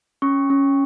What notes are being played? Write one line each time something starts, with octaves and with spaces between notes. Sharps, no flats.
C#4 C#6
C#4